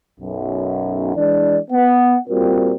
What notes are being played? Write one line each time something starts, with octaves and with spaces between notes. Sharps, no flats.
B1 F#2
E3 G#3 D4 D5
B3 F#5
A#2 G3 C4 F4 F#4 A#4